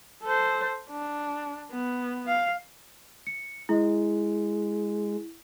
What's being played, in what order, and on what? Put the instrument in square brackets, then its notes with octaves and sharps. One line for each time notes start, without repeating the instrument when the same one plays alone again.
[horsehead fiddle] A4 C5
D4
B3
F5
[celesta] C#7
[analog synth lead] G#3 [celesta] E4